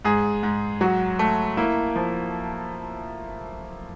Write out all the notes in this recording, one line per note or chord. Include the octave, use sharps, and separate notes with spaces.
G#2 G#4
G#2
F#3 F#4
A3
A#3 E4
F3